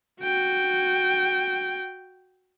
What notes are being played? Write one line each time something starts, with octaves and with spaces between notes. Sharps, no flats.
F#4 G5